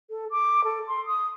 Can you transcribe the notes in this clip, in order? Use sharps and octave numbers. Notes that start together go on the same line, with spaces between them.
A4
D6
A4
C6
D#6